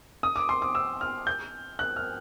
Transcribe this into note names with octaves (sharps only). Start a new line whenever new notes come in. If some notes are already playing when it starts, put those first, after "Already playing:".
D#6
D6
C6
D6
E6
F6
G6
F#6
F6